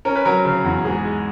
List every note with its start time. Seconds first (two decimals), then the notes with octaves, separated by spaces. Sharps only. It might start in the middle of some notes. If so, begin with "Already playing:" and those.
0.05 C#4 A#4
0.16 B4
0.25 F#3 A#4
0.45 C#3
0.64 E2
0.85 G#2 G#4
1.05 G#3